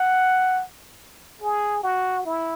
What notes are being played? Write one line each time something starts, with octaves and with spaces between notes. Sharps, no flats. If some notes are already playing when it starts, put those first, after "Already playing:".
Already playing: F#5
G#4
F#4
E4